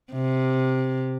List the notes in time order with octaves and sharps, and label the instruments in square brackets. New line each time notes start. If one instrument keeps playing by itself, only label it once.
[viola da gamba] C3